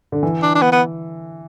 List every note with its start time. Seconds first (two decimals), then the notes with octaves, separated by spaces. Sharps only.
0.12 D3
0.23 E3
0.42 D4
0.55 D4
0.62 B3
0.72 B3